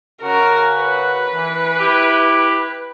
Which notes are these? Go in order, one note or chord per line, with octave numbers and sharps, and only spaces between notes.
C#3 F#4 A#4
B4
E3
E4 G4